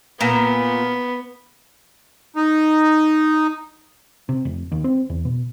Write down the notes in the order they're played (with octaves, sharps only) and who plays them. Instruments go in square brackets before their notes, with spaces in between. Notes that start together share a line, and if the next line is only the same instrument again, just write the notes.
[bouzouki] A#2 [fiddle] B3
[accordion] D#4
[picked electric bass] C3
F1
D#2
C4
E2
B2